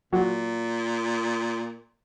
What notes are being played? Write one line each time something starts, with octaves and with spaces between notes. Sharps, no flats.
A#2 F#3 F#4